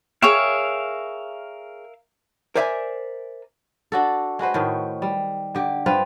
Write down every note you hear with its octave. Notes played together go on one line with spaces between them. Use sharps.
G#4 A#4 C#5 E5 F5 G5
A#4 C5 D5 E5 G#5
D4 F#4 A4
G#3 F#4 B4 C5
A2 D#3
G3
D3 G4
G2 C4 F4 B4